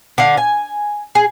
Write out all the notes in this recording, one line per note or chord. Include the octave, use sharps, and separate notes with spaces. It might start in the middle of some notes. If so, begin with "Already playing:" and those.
D3 F5
G#5
G#4